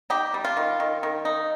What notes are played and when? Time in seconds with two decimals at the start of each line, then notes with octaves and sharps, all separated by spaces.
0.10 D#4 G4
0.34 G3
0.45 F4
0.57 D#3
0.80 D#3
1.03 D#3
1.25 D#4